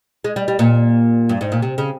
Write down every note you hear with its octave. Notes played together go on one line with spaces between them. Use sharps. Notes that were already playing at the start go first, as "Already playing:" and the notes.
G#3
G3
G3
A#2
G2
G#2
A#2
C3
C#3